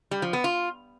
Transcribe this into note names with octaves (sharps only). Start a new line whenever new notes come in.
G3
F3
B3
F4